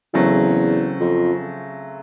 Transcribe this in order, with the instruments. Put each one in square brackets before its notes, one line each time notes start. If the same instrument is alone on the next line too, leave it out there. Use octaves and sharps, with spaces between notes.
[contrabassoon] E2 [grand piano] C#3 F#3 A3 C4
[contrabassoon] F2